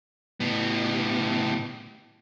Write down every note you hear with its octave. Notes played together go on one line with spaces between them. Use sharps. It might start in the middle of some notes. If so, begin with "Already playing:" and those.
A2 B3